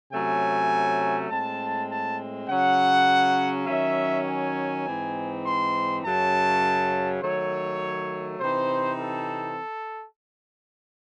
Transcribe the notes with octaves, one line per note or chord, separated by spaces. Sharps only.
C3 F#3 A3 C#4 G#5
A2 G#3 C4 A5
A5
C#3 F#3 C#4 F#5
D#3 F#3 C#4 E5
G#5
G#2 E3 C4 D#4
C6
F#2 C#3 F#3 C#4 A5
D#3 F#3 A3 C#5
C3 E3 C4 D#4 C5
A4